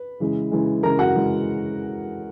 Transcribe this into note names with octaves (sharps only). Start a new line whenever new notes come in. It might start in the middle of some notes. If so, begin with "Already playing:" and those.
Already playing: B4
C#3 E3 G#3
C#3 E3 G#3
C#3 E3 G#3 A#4 A#5
F#4 F#5
C#3 E3 G#3